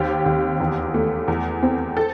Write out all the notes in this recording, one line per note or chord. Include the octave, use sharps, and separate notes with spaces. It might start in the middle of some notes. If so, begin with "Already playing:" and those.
Already playing: D#2 C4 G4
D#2
E2
A3
E2
C4
A4